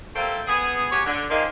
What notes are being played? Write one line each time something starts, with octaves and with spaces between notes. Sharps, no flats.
G3 A3 A#3 C4 A4
B3 G#4
F#3 G4 G#4 C#5
D3
D#3 F3 G#3 A#3